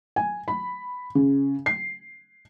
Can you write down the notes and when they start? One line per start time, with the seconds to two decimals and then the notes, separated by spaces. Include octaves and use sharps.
0.16 G#5
0.48 B5
1.15 C#3
1.66 C7